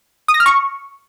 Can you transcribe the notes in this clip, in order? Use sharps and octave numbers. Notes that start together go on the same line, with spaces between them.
D#6
A#6
F6
C#6